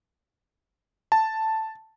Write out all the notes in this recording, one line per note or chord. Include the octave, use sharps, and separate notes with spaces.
A5